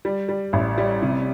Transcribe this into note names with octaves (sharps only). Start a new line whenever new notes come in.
G3
G3
A1
G3
C3